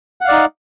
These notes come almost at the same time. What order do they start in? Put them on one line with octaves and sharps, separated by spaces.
F#5 F5 D5 D#4